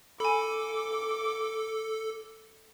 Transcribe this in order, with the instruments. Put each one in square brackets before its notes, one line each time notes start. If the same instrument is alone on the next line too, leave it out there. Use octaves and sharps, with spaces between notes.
[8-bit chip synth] A4 [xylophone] G#5 B5 [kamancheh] D6